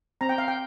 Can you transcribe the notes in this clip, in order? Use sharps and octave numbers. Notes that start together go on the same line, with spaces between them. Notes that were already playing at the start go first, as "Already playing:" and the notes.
C4 A#5
G5
F5
G5